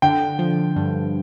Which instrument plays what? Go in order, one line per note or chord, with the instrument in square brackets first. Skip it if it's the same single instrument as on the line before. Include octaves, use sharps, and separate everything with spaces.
[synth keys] D3 [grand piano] G5
[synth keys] F3
G2